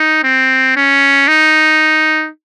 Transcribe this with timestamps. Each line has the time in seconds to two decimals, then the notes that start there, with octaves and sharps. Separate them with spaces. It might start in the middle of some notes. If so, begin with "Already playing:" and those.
Already playing: D#4
0.23 C4
0.76 C#4
1.28 D#4